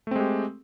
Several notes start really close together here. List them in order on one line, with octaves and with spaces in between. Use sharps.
A3 C4 G#3 G4